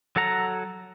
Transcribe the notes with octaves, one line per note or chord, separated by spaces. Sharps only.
F#3 A4 F#5 A#5